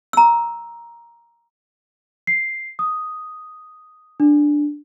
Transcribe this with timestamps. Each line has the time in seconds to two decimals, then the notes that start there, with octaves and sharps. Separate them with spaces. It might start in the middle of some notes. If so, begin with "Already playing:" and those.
0.13 A#5 E6
2.27 C7
2.79 D#6
4.20 D4